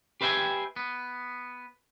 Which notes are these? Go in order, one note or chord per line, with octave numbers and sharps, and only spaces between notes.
G4 B4 C5 E5 G5 G#5
B3